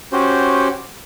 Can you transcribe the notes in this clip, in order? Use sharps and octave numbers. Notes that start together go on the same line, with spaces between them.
C#4 F#4 G4 C5